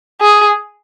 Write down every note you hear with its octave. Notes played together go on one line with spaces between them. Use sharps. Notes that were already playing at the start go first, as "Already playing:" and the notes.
G#4